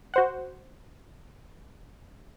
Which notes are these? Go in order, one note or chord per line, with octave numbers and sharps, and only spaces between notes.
F#4 C5 F#5